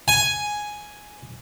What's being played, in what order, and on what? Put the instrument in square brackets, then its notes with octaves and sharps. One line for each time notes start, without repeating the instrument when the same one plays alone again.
[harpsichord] G#5